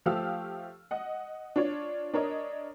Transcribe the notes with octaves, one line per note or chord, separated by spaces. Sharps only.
F3 A3 G4 F5 E6 F6
D#5 F#5
D4 F4 C#5 D5
D4 A#4 C#5 D#5